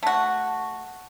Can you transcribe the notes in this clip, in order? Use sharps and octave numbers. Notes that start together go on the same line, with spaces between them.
A3 F#4